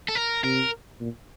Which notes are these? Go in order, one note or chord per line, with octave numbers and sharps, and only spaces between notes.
A4
A#4
C3 A#4
A#2